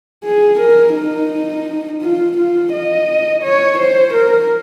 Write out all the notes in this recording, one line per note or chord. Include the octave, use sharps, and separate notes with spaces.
G#4
A#4
D#4
F4
F4
D#5
C#5
C5
A#4